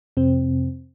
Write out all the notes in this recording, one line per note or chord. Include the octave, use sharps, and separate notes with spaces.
F2 C3 C4